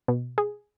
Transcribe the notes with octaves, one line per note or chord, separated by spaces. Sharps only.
B2
G#4